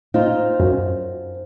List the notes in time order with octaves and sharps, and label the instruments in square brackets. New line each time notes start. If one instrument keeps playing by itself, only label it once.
[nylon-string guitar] C4 D#4 F4
[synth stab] F#2